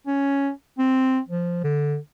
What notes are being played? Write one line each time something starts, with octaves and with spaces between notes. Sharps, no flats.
C#4
C4
F3
D3